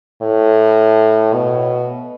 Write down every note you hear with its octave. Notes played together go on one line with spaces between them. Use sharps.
A2
B2